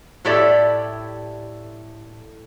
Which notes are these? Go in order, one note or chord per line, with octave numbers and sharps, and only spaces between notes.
A2 E4 G4 A4 D5 E5